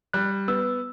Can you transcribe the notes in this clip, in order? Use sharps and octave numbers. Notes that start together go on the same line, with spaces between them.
G3 F#6
B3 E6